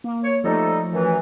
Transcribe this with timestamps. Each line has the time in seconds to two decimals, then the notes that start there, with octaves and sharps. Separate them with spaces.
0.04 A#3
0.24 C#5
0.44 F3 G3 A3 D#4 A4
0.93 F#2 E3